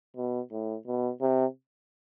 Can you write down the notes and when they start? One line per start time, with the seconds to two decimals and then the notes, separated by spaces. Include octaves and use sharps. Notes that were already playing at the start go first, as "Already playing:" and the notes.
0.16 B2
0.51 A2
0.87 B2
1.21 C3